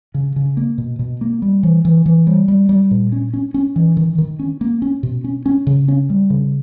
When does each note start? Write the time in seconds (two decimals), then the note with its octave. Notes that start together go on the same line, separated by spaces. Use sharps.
0.14 C#3
0.36 C#3
0.57 A#3
0.78 B2
0.99 B2
1.21 A#3
1.42 G3
1.63 E3
1.85 E3
2.06 E3
2.27 G3
2.48 G3
2.69 G3
2.91 A#2
3.12 C#4
3.33 C#4
3.54 C#4
3.76 E3
3.97 D#3
4.18 D#3
4.39 C#4
4.61 A#3
4.82 C#4
5.03 B2
5.24 C#4
5.46 C#4
5.67 C#3
5.88 C#4
6.10 G3
6.30 C#3